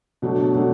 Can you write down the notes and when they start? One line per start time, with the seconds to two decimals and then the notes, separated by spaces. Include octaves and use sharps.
0.22 B2 F#3 A3 D4
0.55 B2 F#3 A3 D4